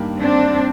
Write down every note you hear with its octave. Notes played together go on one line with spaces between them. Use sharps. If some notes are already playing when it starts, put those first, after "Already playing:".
Already playing: G2 D#3 G3 A#3
C4 D4